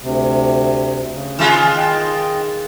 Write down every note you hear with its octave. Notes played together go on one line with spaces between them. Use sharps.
D2 C3
C#3
D#3 G#3 F4
D#5 G5